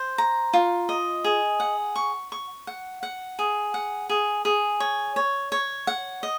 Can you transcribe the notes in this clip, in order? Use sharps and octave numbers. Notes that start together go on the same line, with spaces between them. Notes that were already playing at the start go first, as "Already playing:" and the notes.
Already playing: C5
A#5
F4
D#5
G#4
F#5
C#6
C#6
F#5
F#5
G#4
F#5
G#4
G#4
C#5
C#5
C#5
F#5
D#5